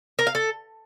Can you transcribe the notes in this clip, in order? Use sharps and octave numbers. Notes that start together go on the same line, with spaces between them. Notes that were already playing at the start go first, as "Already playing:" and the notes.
A#4
F5
A4